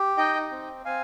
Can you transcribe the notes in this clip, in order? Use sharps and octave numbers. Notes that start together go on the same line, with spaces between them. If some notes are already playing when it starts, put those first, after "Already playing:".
Already playing: G4
D#4 D#5 G5
C4
C4 F5 G#5